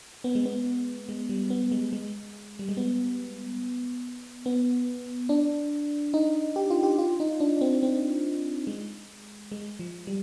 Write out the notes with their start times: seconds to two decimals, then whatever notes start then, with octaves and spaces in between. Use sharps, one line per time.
0.24 B3
0.35 G#3
0.46 B3
1.09 G#3
1.29 G3
1.50 B3
1.72 G#3
1.93 G#3
2.59 G3
2.69 G#3
2.77 B3
4.46 B3
5.29 D4
6.14 D#4
6.56 G4
6.70 F4
6.83 G4
6.98 F4
7.20 D#4
7.40 D4
7.61 C4
7.83 C4
8.67 G#3
9.52 G#3
9.79 F3
10.07 G3